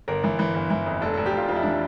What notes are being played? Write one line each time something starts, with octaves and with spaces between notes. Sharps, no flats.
G1 A#4
E3
E3
G1
E3
F2
F1 A4
F1 A4
G4
F1 F4
F2 F4
E4
E3 D4
E4